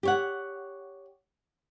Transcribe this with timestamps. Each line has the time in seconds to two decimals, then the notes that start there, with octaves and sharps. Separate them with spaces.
0.03 G4 C#5 F#5